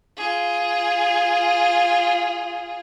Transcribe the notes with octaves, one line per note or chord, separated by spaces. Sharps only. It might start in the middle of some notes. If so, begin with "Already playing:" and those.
F4 G#4